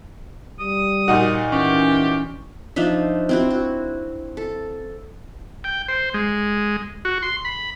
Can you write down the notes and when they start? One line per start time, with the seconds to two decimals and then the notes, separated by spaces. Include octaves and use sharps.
0.60 G3 D#6
1.08 A#2 D#4 F#4
1.52 E3 C#4 G4
2.76 F3 D4 D#4 E5
3.29 C4 E4 F#4
3.51 F#4
4.37 A4
5.64 G5
5.88 C5
6.14 G#3
7.05 F#4
7.22 C6
7.45 B5